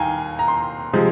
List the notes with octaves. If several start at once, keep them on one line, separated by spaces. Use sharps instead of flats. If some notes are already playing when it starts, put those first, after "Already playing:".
Already playing: D#2 D#3 F5 G5 G#5 A#5
A#5
C6
C3 F3 G#3